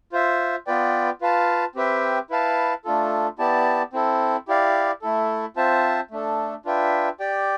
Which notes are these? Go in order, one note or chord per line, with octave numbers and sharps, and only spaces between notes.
F4 C5 E5
B3 F4 B4 D5 G5
F4 B4 F5 A5
C4 G4 B4 E5 G5
E4 B4 F5 A5
A3 D4 F4 A4
B3 E4 G4 D5 A5
C4 E4 A4
E4 G4 D5 F5
A3 E4 A4
C4 F4 C5 E5 A5
A3 D4 A4
D4 F4 B4 E5 G5
G4 D5 G5